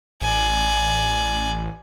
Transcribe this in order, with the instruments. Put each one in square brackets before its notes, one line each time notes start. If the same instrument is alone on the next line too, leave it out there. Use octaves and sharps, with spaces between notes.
[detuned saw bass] A1 [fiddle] D5 G#5